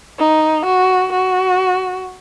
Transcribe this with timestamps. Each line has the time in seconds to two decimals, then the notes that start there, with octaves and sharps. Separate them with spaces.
0.19 D#4
0.66 F#4
1.12 F#4